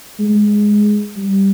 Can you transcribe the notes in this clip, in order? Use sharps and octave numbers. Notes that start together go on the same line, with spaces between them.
G#3
G3